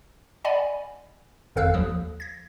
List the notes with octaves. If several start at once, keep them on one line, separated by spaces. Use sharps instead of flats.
D5 D#5 F#5 G#5 B5
G#1 F2 A4 F5 E6 F#6
D#2 F3 D#6
G#6 A#6